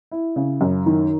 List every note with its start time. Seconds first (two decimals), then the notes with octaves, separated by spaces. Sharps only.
0.12 E4
0.36 C#3
0.61 F#2
0.86 D#3